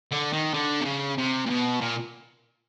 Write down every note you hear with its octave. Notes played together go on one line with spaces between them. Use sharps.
D3
D#3
D3
C3
C#3
C3
A#2
B2
A#2